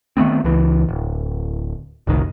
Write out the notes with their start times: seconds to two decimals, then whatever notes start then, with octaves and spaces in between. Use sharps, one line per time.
0.17 D#3 A3 B3 C4
0.44 C#2 E3
0.89 D1
2.07 F#1 C2 A2 D#3